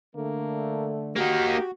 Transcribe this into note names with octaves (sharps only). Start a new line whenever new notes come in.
D3 A3 A#3
A#3 D#4 F#4 G4